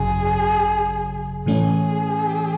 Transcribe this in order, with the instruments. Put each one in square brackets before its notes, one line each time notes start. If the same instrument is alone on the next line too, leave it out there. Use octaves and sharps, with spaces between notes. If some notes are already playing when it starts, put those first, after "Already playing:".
Already playing: [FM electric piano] G#1 F#2 C#3 F#3 [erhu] G#4
[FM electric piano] A2 E3 A3 C#4 [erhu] G#4